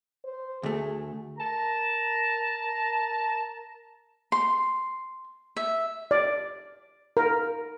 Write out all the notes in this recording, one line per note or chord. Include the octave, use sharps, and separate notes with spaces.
C5
D2 A3 G#4
A#4 A5 A#5
C6
E5
D5
A#4